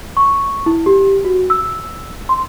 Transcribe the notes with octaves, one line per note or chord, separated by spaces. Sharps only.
C#6
E4
G4
F#4
E6
C6